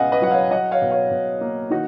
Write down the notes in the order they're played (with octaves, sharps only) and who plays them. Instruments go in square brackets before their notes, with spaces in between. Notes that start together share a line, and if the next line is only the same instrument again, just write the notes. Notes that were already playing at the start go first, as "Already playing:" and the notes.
Already playing: [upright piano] C#2 B2 B3 D#5 F5 F#5 G#5
B4 D#5
F#3 F#5
C#5 F5
F#3 D#5 F#5
C#5 F5
B2
C#5 F5
B2
A#3
D#3 D#4 F#4